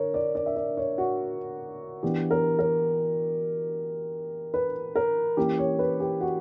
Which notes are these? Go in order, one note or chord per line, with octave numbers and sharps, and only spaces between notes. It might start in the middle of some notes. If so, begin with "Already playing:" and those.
Already playing: D3 A#4 C#5
D5
D5
E5
D5
C#5
F#4
E3 B3 D4 G4
A#4
A#4
B4
A#4
E3 A#3 C#4 E4 G4
C#5
B4
G4
F#4